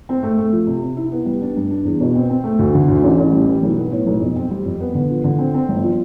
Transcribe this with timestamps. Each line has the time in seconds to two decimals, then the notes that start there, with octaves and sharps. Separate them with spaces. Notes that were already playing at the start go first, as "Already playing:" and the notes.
0.09 C4
0.23 A3
0.38 A3
0.52 F3
0.67 C3
0.82 C3
0.97 E4
1.12 B3
1.26 G3
1.42 D4
1.56 G2
1.71 D4
1.85 E2
2.00 B2
2.15 C4
2.30 C4
2.44 A3
2.59 D2
2.74 D3
2.88 D2
3.04 A1
3.18 A1
3.32 G3
3.47 E3
3.63 B1
3.77 B3
3.92 A2
4.06 B1
4.21 F2
4.36 C4
4.51 G3
4.65 F2
4.80 B3
4.94 D3
5.10 F3
5.24 D3
5.39 C4
5.54 C4
5.69 G1
5.84 F3